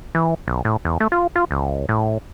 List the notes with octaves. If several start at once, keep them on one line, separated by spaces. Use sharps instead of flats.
E3
B1
A2
E2
A3
F4
F4
C#2
A2